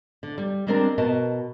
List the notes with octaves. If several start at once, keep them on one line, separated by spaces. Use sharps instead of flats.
D3
G3
G3 G#3 C4 D4 A#4
B2 F#4 A#4 D#5 A5